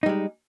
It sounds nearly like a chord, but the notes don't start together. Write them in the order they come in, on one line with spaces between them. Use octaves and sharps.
D#4 G3 G#3